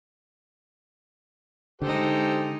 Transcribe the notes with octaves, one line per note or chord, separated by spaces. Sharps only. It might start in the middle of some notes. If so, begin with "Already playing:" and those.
D3 G#3 D#4 G4 A4 C5